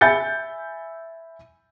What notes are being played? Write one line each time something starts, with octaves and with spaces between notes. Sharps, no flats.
E5 G#5 B5 G6 A6 C#7